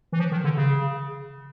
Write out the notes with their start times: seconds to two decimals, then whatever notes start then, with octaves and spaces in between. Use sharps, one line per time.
0.12 E3
0.19 F3
0.31 D#3
0.44 D3
0.57 C#3